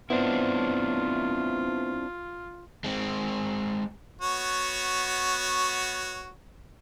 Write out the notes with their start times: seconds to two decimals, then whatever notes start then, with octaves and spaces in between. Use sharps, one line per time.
0.10 B3 C4 D4 E4 F4 C5
2.84 G#3 C4
4.21 B3 F#4 C#5